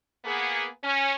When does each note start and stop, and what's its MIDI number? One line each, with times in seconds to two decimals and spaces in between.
0.25 0.67 58
0.25 0.67 59
0.25 0.67 68
0.83 1.14 61